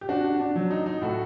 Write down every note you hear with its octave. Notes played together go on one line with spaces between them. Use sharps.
G4
D4 F#4
D4
D4
F#3
D#4
D#4
A2 F#4 A4